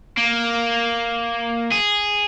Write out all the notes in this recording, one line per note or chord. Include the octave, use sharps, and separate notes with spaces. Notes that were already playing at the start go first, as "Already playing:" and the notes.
A#3
G#4